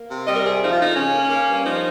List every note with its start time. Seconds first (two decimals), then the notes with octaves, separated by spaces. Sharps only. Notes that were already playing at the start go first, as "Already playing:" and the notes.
Already playing: A#3
0.11 C3
0.27 G3 D#5
0.36 A#4
0.44 C3 G#4
0.62 F3 D#4
0.72 F4
0.79 F2 D#4
0.96 C#3 C#4
1.13 A#3
1.30 A#3
1.48 G2
1.65 F3 D#4